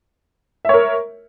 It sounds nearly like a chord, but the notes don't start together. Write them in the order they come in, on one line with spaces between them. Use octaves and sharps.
E5 C#5 A#4